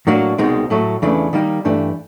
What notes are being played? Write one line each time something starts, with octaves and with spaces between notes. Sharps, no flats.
A2 F#3 A#3 D4 F#4
C2 B2 G#3 C4 D#4
A2 F#3 A3
E2 C#3 E3 A3 D4
D#3 G3 A#3 D#4 G4
G2 E3 A3 D4 G4